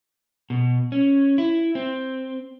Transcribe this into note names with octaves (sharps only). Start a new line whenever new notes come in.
B2
C#4
E4
C4